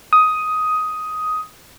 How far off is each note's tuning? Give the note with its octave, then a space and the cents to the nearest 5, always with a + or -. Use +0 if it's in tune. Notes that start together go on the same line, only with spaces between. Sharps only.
D#6 +10